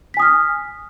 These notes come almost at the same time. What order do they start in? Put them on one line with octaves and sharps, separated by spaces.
B6 G#5 D#6 F6